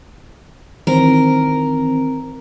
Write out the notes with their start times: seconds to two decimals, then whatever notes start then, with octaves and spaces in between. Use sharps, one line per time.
0.87 D#3 E3 C4 A#4